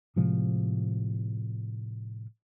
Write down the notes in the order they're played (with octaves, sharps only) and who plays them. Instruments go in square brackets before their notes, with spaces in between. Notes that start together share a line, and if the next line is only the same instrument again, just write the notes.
[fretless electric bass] A2 C3 F3 G#3